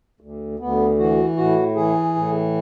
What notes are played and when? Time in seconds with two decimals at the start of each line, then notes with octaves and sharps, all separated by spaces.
0.21 D2
0.59 D2 B3
0.99 E3 F#4
1.37 A2 F#4
1.75 E3 G#4
2.15 A2